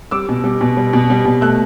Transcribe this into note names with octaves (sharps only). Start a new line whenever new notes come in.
G3 D6 E6
B2
G3
B2
G3
B2
G3
B2
A3 E6 F#6